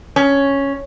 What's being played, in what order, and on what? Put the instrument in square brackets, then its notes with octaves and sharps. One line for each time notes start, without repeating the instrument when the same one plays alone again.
[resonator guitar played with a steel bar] C#4